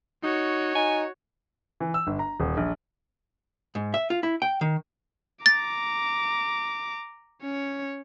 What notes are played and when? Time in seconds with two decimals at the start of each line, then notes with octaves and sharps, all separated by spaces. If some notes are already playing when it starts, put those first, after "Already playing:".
0.23 D#4 F#4 C#5
0.75 D#4 G#5
1.80 E3
1.94 E6
2.07 G1
2.19 A#5
2.40 D#1
2.57 A#1
3.75 G#2
3.94 E5
4.10 F4
4.23 E4
4.42 G5
4.61 D#3
5.46 A#5 D6 A6
7.43 C#4 C#5